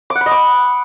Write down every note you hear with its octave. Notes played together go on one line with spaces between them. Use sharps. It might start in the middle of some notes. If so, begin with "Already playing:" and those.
D6
F#5
B5
D#5
D6